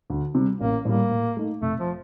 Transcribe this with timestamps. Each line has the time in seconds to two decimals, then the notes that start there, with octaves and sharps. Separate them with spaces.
0.10 D2
0.35 C3 G3
0.61 A1 A#3
0.85 A2 G3 A#3
1.11 A2
1.37 A3 D#4
1.62 F1 A3
1.79 F3